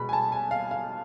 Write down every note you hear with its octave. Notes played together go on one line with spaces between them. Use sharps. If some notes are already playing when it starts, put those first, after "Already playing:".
Already playing: B2 G#3 B3 B5
G#5
A5
G#5
F5
F5